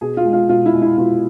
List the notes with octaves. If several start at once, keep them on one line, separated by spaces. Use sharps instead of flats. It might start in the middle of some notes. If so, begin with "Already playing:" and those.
B2 G#4
F4
G#3
F4
B2 F4
E4
G#3
E4
B2 F4